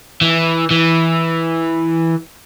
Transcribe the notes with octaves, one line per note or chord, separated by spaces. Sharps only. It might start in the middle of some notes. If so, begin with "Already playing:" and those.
E3
E3